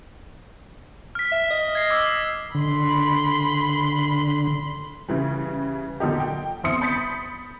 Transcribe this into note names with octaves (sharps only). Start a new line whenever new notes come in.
F6 B6
E5
D#5
G#6 A#6 C7
D6 E6 C7
D3 B5 C6
C#3 E3 G3
A#2 D3 F#3 D#4 G4
G5
G1 C4 E4 C6 D#6 C#7
B5 G6 A6 B6 C#7